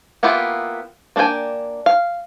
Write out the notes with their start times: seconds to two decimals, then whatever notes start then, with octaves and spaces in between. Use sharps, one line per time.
0.23 A#3 B3 E4 F4 G4
1.16 A#3 D4 A4 G5 G#5
1.86 F5